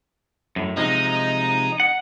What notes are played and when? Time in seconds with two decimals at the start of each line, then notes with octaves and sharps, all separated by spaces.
0.56 F#2 A2
0.77 C3 F3 G#3 D#4
1.80 F#5